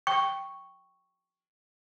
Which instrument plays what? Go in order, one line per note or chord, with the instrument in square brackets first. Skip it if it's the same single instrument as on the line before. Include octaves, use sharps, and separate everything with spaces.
[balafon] G5 [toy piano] C#6